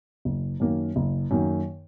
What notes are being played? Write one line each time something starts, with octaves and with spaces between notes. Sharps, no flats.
F#1
F#2 D#3 A#3
F#1
F#2 D#3 A#3